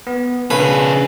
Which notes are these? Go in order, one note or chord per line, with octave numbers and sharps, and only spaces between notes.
B3
C#3 D4 G#4 B4